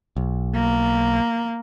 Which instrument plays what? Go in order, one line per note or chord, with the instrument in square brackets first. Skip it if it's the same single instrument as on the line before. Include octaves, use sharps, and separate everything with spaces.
[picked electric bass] B1
[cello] A#3